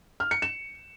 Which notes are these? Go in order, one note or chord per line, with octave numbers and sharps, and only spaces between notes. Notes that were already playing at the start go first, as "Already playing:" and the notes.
F6
C#7
E7